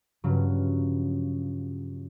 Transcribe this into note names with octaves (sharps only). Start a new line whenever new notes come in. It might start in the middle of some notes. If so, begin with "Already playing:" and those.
G2 C#3 F3 F#3